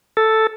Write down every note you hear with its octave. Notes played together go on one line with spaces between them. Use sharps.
A4